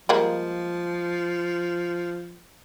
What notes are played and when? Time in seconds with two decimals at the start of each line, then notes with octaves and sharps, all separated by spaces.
0.09 F3 G3 G#3 A#3